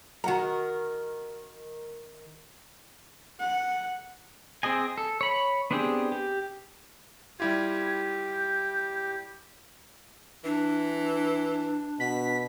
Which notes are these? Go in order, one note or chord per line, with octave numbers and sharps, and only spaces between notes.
D#3 F#4 A#4 F#5 A#5
F#5
C4 G#4 D#5 G#5
A4
C#5 B5
B3 C4 D4 G4 G#4
G4
G3 E4 F4 G4 G#6
G6
E3 D4
B2 B6